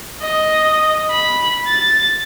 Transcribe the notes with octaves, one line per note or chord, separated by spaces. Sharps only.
D#5
B5
A6